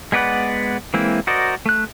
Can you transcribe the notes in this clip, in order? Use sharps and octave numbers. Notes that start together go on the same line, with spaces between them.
G#3 B3 B4 D5 F#5
E3 G#3 A#3 C4 E4
F#4 A#4 C5 D5 D#5
A3 F#6